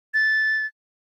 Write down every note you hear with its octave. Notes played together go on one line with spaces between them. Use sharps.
A6